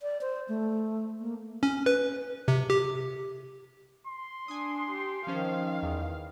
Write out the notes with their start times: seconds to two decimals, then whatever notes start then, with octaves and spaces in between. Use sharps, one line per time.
0.02 D5
0.21 C5
0.49 A3
1.20 A#3
1.63 C#4
1.86 B4
2.48 C3
2.70 G4
4.07 C6
4.48 D4 G#5 D#6
4.91 G4
5.27 D#3 F3 C#4 C5 F5
5.83 E2